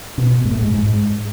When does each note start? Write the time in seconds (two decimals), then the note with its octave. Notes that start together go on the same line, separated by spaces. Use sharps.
0.18 B2
0.45 G#2
0.51 A2
0.62 G#2
0.74 G#2
0.86 G#2